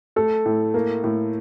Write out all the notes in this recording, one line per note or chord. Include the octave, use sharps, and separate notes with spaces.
A3 A4
A2
A#3
A2